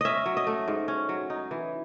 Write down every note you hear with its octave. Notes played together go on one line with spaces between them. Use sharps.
C#4 D#5 E5
F#3
D#5
A3
G#2
C#4
F#3
D#4
E3